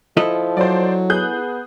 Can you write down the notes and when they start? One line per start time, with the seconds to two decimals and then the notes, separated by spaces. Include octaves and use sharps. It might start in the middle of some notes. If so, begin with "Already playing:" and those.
0.17 F3 E4 A4 D#5
0.57 F#3 C5 D5
1.10 B3 G#4 F#6 G6